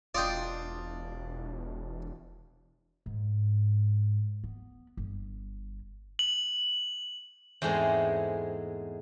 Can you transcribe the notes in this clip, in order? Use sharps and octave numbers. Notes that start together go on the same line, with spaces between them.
E1 D4 F4 D5 D#5 G5
G#2
B3
G1
F#7
E2 G#2 G#3 A3 C4